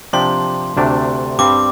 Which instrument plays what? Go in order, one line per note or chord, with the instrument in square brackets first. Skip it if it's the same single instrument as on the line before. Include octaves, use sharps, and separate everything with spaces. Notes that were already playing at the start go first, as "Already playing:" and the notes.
[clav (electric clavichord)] C3 F3 D4 G4 [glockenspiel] C6
[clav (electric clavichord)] D2 C3 A3 D4
[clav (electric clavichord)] G2 G3 C4 [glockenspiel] D6